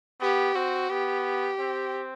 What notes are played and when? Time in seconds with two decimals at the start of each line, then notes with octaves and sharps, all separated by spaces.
0.21 B3 G4
0.55 C4 F#4
0.90 B3 G4
1.59 C4